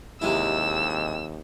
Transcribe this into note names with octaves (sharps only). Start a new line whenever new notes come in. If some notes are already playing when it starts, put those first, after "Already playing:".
D#2 C3 G#3 E4 E6